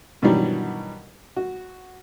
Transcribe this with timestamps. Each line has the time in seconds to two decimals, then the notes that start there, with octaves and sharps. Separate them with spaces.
0.22 G2 B2 D#3 E3 F#3 G3
1.36 F#4